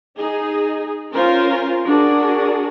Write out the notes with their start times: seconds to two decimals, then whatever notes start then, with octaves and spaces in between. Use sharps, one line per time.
0.18 D#4 G#4
1.14 C#4 F4 A#4 C5
1.85 D4 F#4 G#4 A#4